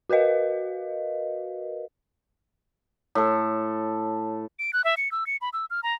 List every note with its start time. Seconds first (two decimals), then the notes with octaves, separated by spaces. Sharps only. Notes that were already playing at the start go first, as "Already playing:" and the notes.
0.10 F#4 A#4 B4 D#5 F5
3.15 A2 A4
4.59 D7
4.73 F#6
4.84 E5
4.97 C#7
5.12 E6
5.27 C#7
5.41 B5
5.53 E6
5.70 F6
5.83 A#5